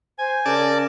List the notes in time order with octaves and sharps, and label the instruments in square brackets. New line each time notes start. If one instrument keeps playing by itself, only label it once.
[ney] C5 [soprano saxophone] G#5
[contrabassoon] C#3 [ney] A#4 [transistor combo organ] D5 A5